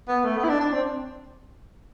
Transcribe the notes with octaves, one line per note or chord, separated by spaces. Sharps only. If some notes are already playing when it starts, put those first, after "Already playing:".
B3
A3
B3
E4
D4
D4
C4